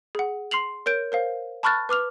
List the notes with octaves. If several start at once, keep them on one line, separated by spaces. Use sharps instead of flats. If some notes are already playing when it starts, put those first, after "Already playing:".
G#4 F#5
C6 C7 F7 F#7
A#4 C#5 G6 D7
A#4 C5 F5
A5 B5 C#6 F6 F#6 A6
B4 D6 F6 F7